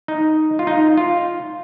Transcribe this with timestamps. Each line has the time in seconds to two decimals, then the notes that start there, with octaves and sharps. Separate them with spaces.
0.08 D#4
0.59 F4
0.67 D#4
0.97 F4